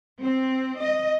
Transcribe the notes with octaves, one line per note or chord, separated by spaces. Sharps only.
C4
D#5